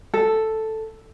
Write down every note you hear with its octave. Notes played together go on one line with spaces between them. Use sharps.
A4